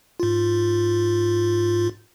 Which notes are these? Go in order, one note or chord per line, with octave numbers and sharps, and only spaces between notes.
G#2 F4